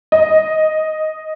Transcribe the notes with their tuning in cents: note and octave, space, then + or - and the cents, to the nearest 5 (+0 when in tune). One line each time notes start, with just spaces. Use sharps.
D#5 +5